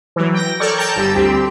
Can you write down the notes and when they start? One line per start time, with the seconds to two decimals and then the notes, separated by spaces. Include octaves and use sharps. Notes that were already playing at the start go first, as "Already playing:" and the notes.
0.16 E3 F#3
0.33 G5 A#6
0.60 A4 A#4 C#5 D5 C#6
0.78 G5 A5 A#5 G6
0.96 G1 G3 E6
1.15 D2 C4 G4